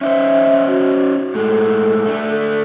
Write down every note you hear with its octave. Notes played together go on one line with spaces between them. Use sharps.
C#4 D#4 C5 E5
F#4
A2 G#3 A4
A3 D4